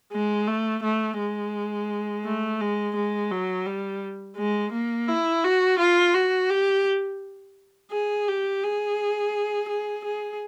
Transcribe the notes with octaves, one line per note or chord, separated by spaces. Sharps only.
G#3
A3
A3
G#3
A3
G#3
G#3
F#3
G3
G#3
A#3
E4
F#4
F4
F#4
G4
G#4
G4
G#4
G#4
G#4